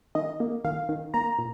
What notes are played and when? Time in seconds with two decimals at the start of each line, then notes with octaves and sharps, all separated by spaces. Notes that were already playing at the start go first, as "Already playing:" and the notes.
0.15 D#3 D#5
0.40 A#3
0.65 D#3 F5
0.89 D#3
1.14 A#3 A#5
1.39 A#2